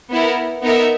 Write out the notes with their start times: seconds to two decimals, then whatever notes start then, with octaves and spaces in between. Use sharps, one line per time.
0.11 B3 E4 A#4
0.63 B3 D#4 A#4 E5